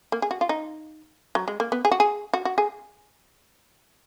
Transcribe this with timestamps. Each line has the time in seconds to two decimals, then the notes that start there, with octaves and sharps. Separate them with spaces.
0.12 A#3
0.22 G#4
0.31 F#4
0.41 F4
0.49 D#4
1.35 F#3
1.48 G#3
1.60 A#3
1.72 B3
1.85 G#4
1.91 F#4
2.00 G#4
2.33 F#4
2.45 F#4
2.58 G#4